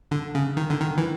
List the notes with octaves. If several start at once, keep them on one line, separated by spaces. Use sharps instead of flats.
D3
C#3
D#3
D3
D#3
E3